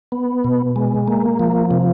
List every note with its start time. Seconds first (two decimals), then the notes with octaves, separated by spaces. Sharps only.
0.12 B3
0.44 B2
0.76 G#3
1.08 A#3
1.39 F3
1.71 C3